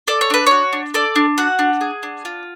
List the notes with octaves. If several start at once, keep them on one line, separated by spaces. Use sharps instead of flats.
A4 D5
C#5
D4 B4
F#4 C#5
D4
A4 D5
D4
F#4 F#5
D4
G#4
D4
F4